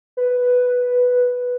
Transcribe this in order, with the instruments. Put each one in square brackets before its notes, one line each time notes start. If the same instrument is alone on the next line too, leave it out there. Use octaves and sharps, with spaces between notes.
[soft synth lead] B4